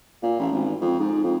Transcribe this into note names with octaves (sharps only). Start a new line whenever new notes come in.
A#2
A1
G#1
F2
G#2
F2